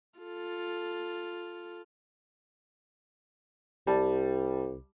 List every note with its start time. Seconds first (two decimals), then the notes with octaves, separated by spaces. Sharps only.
0.19 F4 A4
3.87 C2 G3 A5